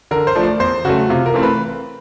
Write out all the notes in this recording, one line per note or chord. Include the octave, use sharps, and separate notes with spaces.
D3 A#4
C5
F3 A3 D4
D5
E2 C5
C#3 F#3 A3 F#4
C3 F4
A#4
E3 A3 C4
B4